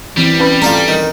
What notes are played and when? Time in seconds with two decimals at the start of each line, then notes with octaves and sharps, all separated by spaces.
0.17 E3 G3 C4
0.39 C#4 B4 B5
0.62 A3 F4 D5 A5 A#5
0.88 D#3